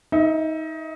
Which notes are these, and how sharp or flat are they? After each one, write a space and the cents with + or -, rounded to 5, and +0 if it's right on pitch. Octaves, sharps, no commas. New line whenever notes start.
D#4 +25 E5 +0